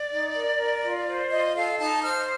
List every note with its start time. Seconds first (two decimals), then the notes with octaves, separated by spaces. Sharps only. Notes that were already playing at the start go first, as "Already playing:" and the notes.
Already playing: D5
0.11 D#4
0.35 A#4
0.58 A#4
0.83 F4
1.07 C5
1.30 F4 D#5
1.55 A4 F5
1.78 D#4 A5
2.02 C5 F6